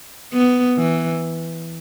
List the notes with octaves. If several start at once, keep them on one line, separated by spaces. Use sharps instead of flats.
B3
E3